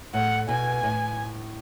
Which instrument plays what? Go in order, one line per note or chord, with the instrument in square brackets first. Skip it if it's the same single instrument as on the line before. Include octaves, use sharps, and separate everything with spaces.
[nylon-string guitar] A2 [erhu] F#5
[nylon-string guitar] B2 [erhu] G#5
[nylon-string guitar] A2